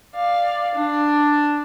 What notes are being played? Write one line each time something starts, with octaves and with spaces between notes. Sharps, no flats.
D5 F5
D4